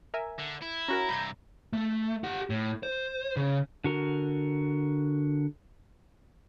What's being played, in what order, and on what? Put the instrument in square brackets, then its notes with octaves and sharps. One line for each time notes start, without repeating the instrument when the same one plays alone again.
[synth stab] A#4 E5 G#5
[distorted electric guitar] D3
E4
[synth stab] C#4 F#4 A#4 [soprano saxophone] A#5
[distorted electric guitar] G2 C3 [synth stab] B5 G6 G#6
[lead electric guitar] A3
G4 F#5
A2
C5
C#3
[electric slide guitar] D3 F#4 A#4